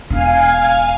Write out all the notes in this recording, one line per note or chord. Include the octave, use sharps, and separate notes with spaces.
E1 D4 F5 G#5